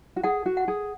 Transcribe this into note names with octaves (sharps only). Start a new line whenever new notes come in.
F#4
G#4 F#5
F#4
F#5
G#4